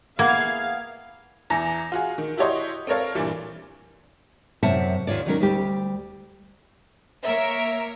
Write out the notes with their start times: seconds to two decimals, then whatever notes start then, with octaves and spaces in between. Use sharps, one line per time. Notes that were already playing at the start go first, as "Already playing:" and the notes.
0.19 A#3 B3 E4 G#4 F5 G#6
1.50 E2 E3 A#5 A#6
1.92 F4 F#4 G#4
2.18 D#3
2.37 E4 F#4 G4 C#5 D#5 C6
2.87 C4 A4 A#4 C#5 F5
3.15 G2 A#2 E3 G3
4.63 F#2 C3 F#3 E5 F#5 A5
5.07 D#2 D#3 F4 C#5 D5
5.26 D#3 F#3 C#4 A#4
5.40 D2 G3 G4
7.25 A#3 A#4 C#5 E5